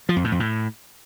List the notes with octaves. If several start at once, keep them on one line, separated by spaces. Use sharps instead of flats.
F3
F2
A2
F2
A2